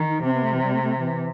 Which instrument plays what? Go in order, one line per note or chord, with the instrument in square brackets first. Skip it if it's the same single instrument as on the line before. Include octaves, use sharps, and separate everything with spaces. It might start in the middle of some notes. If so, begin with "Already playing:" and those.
Already playing: [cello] D#3
[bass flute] D#4
[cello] C3 [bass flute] C4
[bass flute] B3
A3
E3
G3
A3
A3
E3